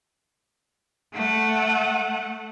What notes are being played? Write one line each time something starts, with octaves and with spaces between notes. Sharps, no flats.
A3 F#5